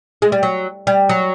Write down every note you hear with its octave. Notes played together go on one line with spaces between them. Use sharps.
G#3
G3
F#3
G3
F#3